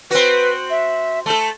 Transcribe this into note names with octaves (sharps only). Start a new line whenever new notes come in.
C4 F#4 B4
E5
A3 A4 A5